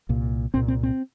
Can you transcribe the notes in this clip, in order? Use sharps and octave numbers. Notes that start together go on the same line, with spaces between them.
C2 A#2
C2 A#2 C4
C4
C4